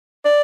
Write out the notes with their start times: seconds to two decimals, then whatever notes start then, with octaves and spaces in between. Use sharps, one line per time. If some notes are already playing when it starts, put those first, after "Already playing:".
0.25 D5